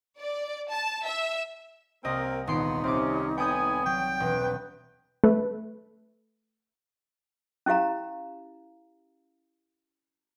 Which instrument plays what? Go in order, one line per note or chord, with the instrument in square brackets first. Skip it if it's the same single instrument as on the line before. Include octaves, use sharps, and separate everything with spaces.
[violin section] D5
A5
E5
[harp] C2 D#5 [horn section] A#3 C4 A#4
[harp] D#1 C6 D7 [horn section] B3 [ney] D#4
[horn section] C3 C#4 [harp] C4 D6
[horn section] A2 B3 G#5 [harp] G5 D#6 G6
[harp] F#3 [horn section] G5
[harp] E1 [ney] B4
[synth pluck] A3 B4
[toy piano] C#4 E4 G4 F5 A#5